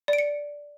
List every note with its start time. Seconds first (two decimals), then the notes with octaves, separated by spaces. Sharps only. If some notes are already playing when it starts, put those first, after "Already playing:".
0.08 D5
0.13 D7
0.18 C#7